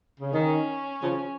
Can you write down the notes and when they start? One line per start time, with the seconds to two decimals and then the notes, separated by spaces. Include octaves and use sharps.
0.20 C#3
0.33 D#3 C#4
1.01 C#3 F3